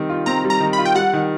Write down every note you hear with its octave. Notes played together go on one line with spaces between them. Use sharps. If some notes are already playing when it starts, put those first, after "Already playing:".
Already playing: D#3 G3 C4
F4
C4 A#5
G3
A#5
D#3
B5
F4
G5
G3 F#5
D#3